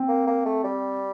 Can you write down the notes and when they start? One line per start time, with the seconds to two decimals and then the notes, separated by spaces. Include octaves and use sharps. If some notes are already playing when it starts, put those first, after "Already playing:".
Already playing: C4
0.08 A#3
0.27 A#3
0.45 A3
0.64 G3